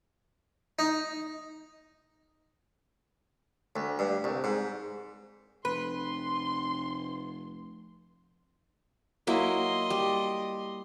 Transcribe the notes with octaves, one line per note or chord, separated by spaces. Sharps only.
D#4
D2
G2
C2
G#2
F1 B4 C6
F#3 A#3 E4 D#5 C6
G3